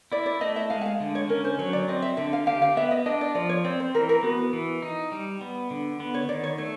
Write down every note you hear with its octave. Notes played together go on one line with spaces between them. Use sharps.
E4 D5
D5
A3 D#5
E5
G#3 F5
F#5
F5
D3
C#5
C#4 A#4
C5
F#3 C#5
D5
C4 D#5
E5
D3 E5
F5
G4 F5
F5
B3 E5
D#5
D4 D#5
D5
F3 D5
C#5
C4 D5
C5
E3 A#4
A#4
B3 F#4
E3
D#4
G3
B3
D3
B3
C#5
D#3 D5
C#5
A3 C#5